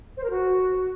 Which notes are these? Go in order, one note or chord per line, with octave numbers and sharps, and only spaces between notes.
C5
A#4
F#4